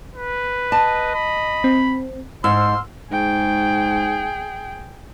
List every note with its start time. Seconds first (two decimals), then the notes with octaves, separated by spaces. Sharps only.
0.15 B4
0.72 D#5 A5
1.15 B5
1.64 C4
2.44 G#2 C5 C6 E6 F6
3.11 G#2 G#4 G5